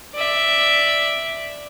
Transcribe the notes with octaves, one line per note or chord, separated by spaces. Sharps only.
D5 E5